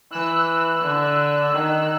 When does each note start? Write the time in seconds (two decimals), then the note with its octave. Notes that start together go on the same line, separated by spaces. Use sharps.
0.11 E3 E6 F#6
0.81 D3
1.52 D#3